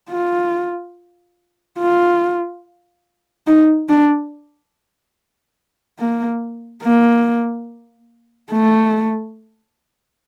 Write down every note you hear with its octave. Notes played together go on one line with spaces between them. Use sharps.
F4
F4
D#4
D4
A#3
A#3
A3